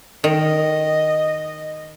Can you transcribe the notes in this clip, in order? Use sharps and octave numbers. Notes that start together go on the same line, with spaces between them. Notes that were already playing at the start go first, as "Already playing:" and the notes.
D#3 D#5